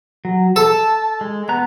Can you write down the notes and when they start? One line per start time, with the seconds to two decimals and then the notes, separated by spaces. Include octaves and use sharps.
0.25 F#3
0.56 A4 A5
1.21 G#3
1.49 B3 A#5 F#6